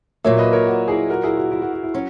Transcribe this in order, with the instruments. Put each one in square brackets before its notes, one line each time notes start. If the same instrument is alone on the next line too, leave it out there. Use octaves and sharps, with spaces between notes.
[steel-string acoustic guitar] A#2 F#3 A#3 [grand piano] C#5 E5
[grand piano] B4 D#5
A#4 C#5
F#4
E4 G#4
F#4 A#4
E4 G#4
F#4
E4
F#4
F#4
E4
[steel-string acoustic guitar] F#3 C#4 [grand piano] F#4